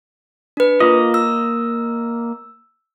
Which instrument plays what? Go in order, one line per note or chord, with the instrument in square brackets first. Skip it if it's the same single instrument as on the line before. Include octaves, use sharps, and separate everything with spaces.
[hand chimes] D4 B4
[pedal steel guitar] A#3 D#5 [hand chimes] F4
[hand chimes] E6